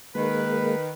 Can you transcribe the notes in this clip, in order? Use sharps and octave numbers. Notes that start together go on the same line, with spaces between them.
D#3 G#3 A#3 B4